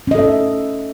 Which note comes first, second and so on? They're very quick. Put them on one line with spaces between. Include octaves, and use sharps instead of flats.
C#4 D#5 A4 E5